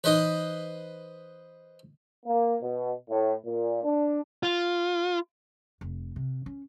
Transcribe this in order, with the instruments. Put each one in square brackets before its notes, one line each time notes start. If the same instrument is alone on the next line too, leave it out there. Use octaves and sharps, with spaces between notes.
[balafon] E3 D#4 [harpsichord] B4 C5 D#5
[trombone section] A#3
B2
A2
A#2
D4
[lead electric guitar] F4
[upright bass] F1
C3
C#4